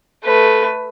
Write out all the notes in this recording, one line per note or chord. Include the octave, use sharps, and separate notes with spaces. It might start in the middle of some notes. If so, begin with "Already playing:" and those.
A3 B4